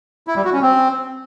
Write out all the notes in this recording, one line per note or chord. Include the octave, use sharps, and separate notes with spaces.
E4
G3
F#4
C#4
C4